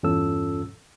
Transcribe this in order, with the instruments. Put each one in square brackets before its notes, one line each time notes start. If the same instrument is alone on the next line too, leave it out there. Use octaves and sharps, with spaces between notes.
[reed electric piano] E2 G2 C#4 F4 A4 E6